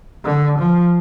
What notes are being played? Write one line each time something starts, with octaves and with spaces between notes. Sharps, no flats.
D3
F3